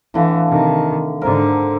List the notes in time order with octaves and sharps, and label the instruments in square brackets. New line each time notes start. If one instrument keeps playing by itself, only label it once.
[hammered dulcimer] A2 D3 F5 [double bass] E3
[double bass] C3 D#3
[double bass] G#2 D3 [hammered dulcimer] A#4 C5